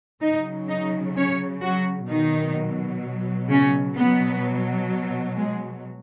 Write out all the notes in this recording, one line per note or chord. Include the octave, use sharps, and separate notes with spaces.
C#3 F#3 D#4 D#5
D#4 D#5
C#4 C#5
F#3 F#4
B2 D#3 F#3 D#4
C#3 C#4
B2 F#3 B3
G#3